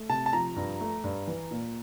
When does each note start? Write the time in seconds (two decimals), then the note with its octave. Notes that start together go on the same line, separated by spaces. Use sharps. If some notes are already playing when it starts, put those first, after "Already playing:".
Already playing: A3
0.09 C3 A5
0.26 A5
0.33 F3 A#5
0.56 G2
0.81 A3
1.04 G2
1.28 E3
1.51 A#2